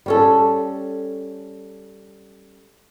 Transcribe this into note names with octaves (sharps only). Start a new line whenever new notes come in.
G3 C#4 A4